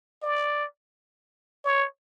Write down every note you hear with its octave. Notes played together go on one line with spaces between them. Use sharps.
D5
C#5